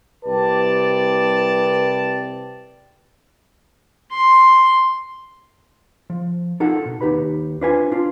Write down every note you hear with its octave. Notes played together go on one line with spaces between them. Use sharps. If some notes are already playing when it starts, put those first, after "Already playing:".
C2 C3 G4 B4 D5 A5
C6
F3
D#4 F4 A4 A#4 F#5
B2
D#2 D#4 G4 B4 B5
D4 F4 B4 C5 G#5
D4 F4